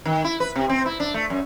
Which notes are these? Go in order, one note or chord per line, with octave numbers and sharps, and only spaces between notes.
D#3
E4
B4
C3
C4
E4
D4
A3
F#2